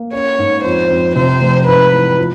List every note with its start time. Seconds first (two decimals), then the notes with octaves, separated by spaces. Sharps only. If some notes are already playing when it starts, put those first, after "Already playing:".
Already playing: A#3
0.13 C#4 C#5
0.39 G#2
0.64 F2 C5
0.90 F2
1.16 C3 C5
1.41 F1
1.67 G#2 B4
1.92 E3
2.18 F3